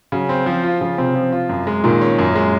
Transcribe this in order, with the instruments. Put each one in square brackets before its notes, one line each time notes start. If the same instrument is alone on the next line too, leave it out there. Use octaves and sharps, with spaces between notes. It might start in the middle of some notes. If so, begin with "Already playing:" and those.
[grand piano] C#3 [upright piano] F#3
[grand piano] C4
F3
F4
[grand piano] C#3 [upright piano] F3
[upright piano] C3 [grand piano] C4
[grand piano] F3
F4
F#2
G#3
[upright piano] A#2 [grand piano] D#3
[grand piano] C#4
F#2
G#3